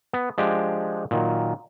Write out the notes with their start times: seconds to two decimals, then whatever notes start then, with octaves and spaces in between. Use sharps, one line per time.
0.13 B3
0.38 F3 G#3 D4 G4
1.11 A#2 D#3 F#3